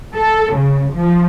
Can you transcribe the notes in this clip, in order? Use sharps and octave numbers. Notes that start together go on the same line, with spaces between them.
A4
C#3
F3